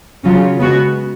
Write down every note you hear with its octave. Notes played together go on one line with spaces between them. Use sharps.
C#3 F#3 C#4 F4
C#3 G#3 B3 F#4